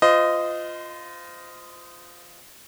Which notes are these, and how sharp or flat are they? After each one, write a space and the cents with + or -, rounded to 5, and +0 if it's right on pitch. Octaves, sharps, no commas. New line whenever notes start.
F4 +0 C5 -30 D#5 +0